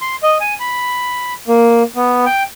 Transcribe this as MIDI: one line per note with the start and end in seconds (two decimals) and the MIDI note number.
0.01 0.15 84
0.23 0.37 75
0.40 0.54 80
0.60 1.33 83
1.48 1.83 58
1.96 2.25 59
2.26 2.43 79